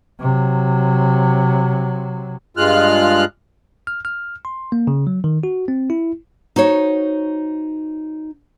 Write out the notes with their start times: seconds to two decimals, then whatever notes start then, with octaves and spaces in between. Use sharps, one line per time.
0.20 C3 F#3
2.57 G2 G#3 F4 F6 F#6
3.87 F6
4.05 F6
4.45 C6
4.72 A#3
4.87 C#3
5.07 F#3
5.24 D#3
5.43 F#4
5.68 C4
5.90 E4
6.56 D#4 F#4 C5 C#5